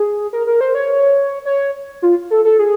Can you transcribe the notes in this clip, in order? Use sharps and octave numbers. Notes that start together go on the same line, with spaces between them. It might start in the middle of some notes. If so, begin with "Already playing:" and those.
Already playing: G#4
A#4
A#4
C5
C#5
C#5
F4
A4
A4
G#4